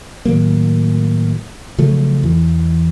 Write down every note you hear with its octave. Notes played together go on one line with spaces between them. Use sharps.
A2 D#3 F#3 A#3
C#3 F3 F#3 A3
E2 E3